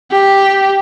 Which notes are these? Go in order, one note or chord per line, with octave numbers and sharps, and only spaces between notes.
G4